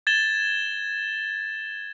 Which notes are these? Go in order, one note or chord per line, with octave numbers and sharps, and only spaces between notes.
G#6 A6 E7 G7